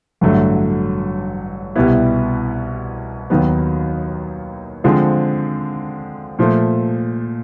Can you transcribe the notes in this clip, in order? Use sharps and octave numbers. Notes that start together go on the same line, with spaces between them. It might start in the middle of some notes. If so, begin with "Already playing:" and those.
A1 G2 D3 F#3 A3
C2 B2 G3 B3 E4
D#2 D#3 F#3 B3
D3 F3 G#3 C4 F4
A#2 F3 A3